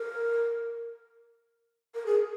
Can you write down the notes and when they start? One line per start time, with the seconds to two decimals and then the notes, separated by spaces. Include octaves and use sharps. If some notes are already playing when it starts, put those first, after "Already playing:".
Already playing: A#4
1.95 A#4
2.06 G#4